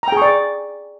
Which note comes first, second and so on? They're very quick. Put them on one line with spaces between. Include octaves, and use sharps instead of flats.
A#5 G5 G#4 C#6 D5